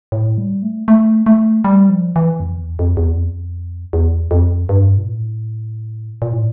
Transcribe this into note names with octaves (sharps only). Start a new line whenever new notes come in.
A2
G3
A3
A3
A3
G3
F3
E3
F2
E2
F2
E2
F2
E2
F2
G2
A#2
A2
A#2
A2